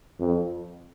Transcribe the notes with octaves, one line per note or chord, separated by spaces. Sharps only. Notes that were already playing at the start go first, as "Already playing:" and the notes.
F2